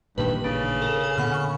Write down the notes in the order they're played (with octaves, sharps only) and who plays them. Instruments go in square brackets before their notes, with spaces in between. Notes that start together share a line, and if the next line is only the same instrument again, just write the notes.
[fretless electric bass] A1 A#2 D#3 [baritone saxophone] G2 [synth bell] B4
[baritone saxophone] C#3 [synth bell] D4
[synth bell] A4 A#4
G#5
[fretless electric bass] A#2 D3 B3 [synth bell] F#5 B5 F6
[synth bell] C#6